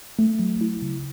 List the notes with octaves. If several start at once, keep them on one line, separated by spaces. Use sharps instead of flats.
A3
F#3
E4
C#3